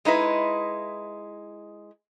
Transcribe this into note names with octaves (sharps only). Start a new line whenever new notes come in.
G#3 D#4 E4 B4